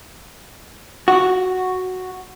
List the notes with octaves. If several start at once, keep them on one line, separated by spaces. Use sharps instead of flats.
F#4